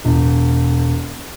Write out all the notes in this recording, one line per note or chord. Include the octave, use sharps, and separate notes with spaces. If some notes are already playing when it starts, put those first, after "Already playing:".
E1